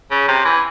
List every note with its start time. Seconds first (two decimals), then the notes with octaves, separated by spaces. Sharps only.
0.11 C#3
0.28 C3
0.45 E3